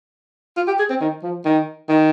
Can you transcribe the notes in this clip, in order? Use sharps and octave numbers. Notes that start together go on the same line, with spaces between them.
F4
G4
G#4
C4
D#3
F3
D#3
D#3